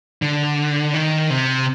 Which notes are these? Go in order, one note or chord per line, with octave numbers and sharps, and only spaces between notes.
D3
D#3
C3